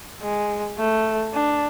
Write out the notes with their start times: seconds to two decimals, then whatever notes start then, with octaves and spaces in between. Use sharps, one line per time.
0.22 G#3
0.78 A3
1.33 D4